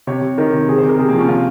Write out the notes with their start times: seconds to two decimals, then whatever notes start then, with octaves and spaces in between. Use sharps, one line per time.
0.07 C3 C#5
0.22 C3
0.38 D#3 A#4
0.53 C3
0.68 C3 G#4
0.78 C5
0.83 C3
0.89 A#4
0.98 C3 G#4
1.09 A#3
1.13 F3
1.19 C#4
1.28 C3 F4